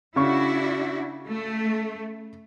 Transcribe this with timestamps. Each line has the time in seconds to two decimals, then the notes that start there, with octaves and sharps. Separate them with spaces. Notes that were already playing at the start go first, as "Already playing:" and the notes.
0.16 C#3 D4 E4 F#4 C#6
1.28 A3